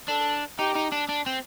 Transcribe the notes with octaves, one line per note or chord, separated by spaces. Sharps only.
D4 A4
D#4 G4
D#4
D4
D4
C4